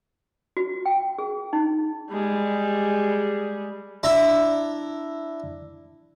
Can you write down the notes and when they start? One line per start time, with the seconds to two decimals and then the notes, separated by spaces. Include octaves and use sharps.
0.57 F#4
0.86 G5
1.18 G#4
1.53 D#4
2.11 G3 G#3
4.03 D4 E4 A#5